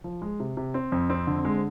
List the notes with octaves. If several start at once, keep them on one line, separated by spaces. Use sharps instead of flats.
F3
G#3
C3
C3
C4
F2
C4
D3
G#3